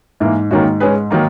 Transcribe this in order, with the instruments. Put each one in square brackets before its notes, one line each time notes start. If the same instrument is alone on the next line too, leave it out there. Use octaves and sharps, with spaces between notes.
[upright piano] G#2 [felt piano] E3 A#3 E4
[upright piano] G#2 [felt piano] D#3 A#3 C#4 F#4
[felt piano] G#3 C#4 G#4 B4
D#3 F#3 A#3 D#4